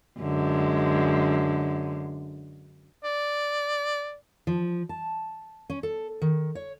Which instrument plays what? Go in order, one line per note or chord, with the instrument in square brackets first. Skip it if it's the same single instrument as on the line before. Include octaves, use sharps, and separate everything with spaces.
[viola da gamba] F#2 D3 G#3
[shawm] D5
[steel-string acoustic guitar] F3
A5
C#4
A4
D#3
C#5